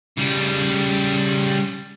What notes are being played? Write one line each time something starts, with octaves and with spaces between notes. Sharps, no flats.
C#3 G3